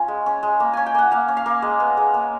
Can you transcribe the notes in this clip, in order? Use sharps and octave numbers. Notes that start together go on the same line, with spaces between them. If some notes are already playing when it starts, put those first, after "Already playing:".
Already playing: C#4 F4
G#3
C#4
G#3
A#3
C#4 G#5
G5
A#3 F#5
A#3 F5
C#4
F5
A#3
G#3
B3
G#3
A#3